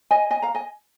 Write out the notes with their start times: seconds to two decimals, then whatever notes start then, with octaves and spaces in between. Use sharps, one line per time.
0.11 D#5 G#5
0.31 D#5 G#5
0.42 F5 A#5
0.55 D#5 G#5